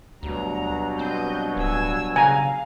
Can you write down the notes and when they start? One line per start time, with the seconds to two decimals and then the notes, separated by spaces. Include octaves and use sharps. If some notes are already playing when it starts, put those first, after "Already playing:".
0.23 D2 G2 B2 F#3 A#5
0.99 C4 D#5 G6
1.57 D1 G#5 E6
2.16 C#3 F5 G#5 A#5